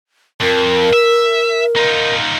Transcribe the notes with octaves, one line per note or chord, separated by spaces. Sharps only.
F2 A#4
E5
D#4 F4